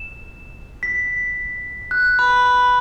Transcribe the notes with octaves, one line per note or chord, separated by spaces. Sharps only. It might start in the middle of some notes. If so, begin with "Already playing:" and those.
Already playing: E7
B6
F#6
B5
B5